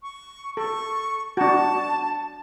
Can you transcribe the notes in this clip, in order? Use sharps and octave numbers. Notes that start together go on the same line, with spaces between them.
C#6
A4 C#6
D4 F#4 A5